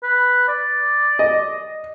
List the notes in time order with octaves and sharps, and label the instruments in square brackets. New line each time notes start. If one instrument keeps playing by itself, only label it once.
[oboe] B4
D5
[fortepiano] D#5